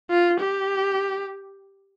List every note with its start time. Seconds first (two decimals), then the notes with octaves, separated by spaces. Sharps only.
0.10 F4
0.40 G4